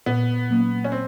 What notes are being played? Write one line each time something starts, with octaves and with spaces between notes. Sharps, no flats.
A#2 B3
F#3 A#3 C#4
C#4
C4